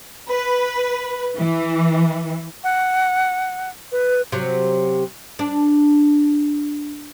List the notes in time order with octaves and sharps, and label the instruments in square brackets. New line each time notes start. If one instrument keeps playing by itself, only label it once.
[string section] B4
E3
[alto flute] F#5
B4
[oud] C3 F#3
D4